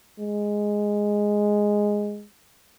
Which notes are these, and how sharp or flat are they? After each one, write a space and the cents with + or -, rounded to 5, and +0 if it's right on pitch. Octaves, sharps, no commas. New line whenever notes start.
G#3 -5